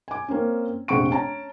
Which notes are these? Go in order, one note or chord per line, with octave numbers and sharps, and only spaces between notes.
G#5 D6
A#3 C4 C#4
F1 A#1 C4 F#5 C#6 D7
C#4 A5 A#5